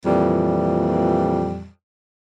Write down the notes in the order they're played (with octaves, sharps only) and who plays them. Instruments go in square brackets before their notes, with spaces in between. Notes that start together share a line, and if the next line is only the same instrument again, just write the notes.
[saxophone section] F2 A#2 E3 G3